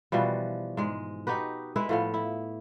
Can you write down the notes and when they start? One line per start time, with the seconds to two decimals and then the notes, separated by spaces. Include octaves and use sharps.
0.12 B2 E3 F3 G3
0.77 G#2 G#3
1.27 D#4 F#4 G4 B4
1.76 G#3 E4 B4 E5
1.89 A2 F3 B3
2.14 E4